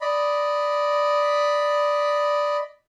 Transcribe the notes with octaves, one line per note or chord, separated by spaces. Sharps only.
D5 D#5 B5